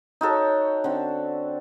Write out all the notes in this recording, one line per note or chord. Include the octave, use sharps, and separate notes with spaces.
D#4 F#4 A4 C#5
D3 C4